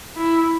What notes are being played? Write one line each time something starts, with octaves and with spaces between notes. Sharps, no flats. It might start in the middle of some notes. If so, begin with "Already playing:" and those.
E4